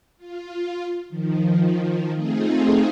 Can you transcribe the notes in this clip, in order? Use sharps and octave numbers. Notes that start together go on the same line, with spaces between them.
F4
D#3 F3
A3 C4 D#4 F4 G#4